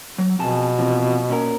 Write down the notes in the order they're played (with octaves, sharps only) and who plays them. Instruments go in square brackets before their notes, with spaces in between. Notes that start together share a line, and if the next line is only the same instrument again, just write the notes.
[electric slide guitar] F#3
[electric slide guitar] F2 G#4 A5 [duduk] B2
[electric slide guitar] E2 C3 F3
A#2 C#4 A#4